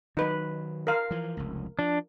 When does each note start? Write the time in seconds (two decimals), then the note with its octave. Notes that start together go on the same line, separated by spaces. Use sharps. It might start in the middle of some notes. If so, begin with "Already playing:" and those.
0.17 D#3 F#3 D#4 B4
0.87 A#4 F5
1.11 E3 F3
1.37 F1 C#2
1.79 F3 D4